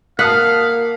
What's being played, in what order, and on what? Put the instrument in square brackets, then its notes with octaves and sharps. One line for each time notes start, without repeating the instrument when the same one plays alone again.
[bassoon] A#3 [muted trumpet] F5 [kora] F#5 [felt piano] A5 D#6 B6